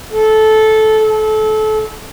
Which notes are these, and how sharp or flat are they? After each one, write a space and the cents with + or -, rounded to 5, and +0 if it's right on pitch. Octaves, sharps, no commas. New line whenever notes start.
A4 -15
A4 -30